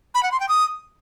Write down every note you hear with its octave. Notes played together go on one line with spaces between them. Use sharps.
B5
F#5
C6
G5
D#6